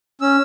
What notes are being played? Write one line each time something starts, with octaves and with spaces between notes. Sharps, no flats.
C#4 E6